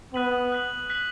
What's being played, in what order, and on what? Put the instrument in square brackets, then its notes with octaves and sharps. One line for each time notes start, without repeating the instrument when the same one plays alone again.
[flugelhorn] B3 [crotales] D#6 F#6 B6 D#7 F#7
[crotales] F#6 B6 F#7
F#6 B6 F#7